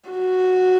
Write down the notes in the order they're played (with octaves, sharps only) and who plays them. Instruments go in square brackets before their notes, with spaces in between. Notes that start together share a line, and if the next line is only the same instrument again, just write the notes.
[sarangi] F#4